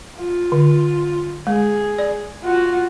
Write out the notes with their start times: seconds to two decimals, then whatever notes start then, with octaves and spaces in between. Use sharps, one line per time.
0.19 F4
0.52 D3
1.47 G#3 G#4
1.98 D5
2.44 F4 F#4